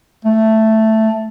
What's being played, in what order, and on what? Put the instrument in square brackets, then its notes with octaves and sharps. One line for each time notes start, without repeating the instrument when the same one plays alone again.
[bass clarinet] A3